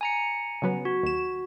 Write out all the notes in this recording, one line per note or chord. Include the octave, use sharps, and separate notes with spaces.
G#5 A#5 C#7
C#3 F#3 B3
F#4
D#2 E7